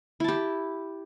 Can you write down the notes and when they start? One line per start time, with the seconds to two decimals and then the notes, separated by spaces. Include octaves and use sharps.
0.20 E4
0.24 A5
0.28 G4